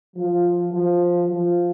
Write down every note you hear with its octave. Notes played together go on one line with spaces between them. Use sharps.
F3
F3
F3